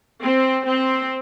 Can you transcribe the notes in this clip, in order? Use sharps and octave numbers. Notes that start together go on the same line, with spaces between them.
C4
C4